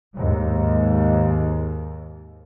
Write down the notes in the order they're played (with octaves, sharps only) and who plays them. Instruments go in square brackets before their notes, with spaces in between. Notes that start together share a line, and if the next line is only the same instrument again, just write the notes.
[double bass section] D#2 G#2